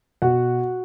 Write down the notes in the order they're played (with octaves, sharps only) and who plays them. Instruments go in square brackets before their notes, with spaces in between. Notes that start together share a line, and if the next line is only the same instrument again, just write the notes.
[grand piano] B2 F#4 F#5